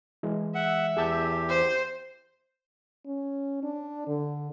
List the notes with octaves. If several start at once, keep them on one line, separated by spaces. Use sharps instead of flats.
E3 G#3
E5 F#5
E2 G4 G#4 A5 G6
C5
C#4
D4
D3